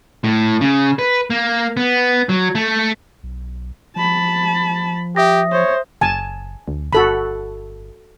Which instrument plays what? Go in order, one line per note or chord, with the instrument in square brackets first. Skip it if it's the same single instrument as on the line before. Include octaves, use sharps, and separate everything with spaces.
[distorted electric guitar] A2
C#3
B4
A#3
B3
F#3
A3
[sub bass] B1
[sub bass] F3 [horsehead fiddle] A5 B5
[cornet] G4 [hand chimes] E5 D#6 A#6
[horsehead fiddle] C5 [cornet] C#5
[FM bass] F#1 [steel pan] G#5 A5
[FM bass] D2
[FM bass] G1 [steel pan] F#4 A4 B5